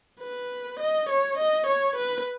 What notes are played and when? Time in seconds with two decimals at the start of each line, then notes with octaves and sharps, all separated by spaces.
0.21 B4
0.79 D#5
1.09 C#5
1.38 D#5
1.67 C#5
1.96 B4